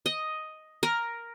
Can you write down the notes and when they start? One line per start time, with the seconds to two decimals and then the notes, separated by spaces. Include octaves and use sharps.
0.06 D#5
0.83 A#4